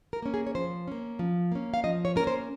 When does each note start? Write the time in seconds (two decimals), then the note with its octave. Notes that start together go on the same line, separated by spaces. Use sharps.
0.13 A#4
0.23 A#3 C#4
0.34 G#4
0.47 C#5
0.55 F3 C5
0.88 A#3 C#4
1.19 F3
1.52 A#3 C#4
1.74 F5
1.84 F3 D#5
2.05 C#5
2.16 A#3 C#4 A#4
2.27 C5